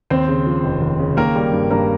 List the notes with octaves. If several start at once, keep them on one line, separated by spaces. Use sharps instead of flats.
D#2 C4 C5
C#3
F3
F1
D#2
C#3
D#3 A#3 A#4
G3
G2
G2 A#3 A#4